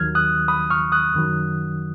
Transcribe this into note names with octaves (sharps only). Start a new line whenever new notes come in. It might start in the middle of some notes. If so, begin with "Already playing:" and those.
Already playing: D#2 D#3 F#3 F6 G#6
D#6 F#6
B5 D#6
C#6 F6
D#6 F#6
F#2 D#3 F#3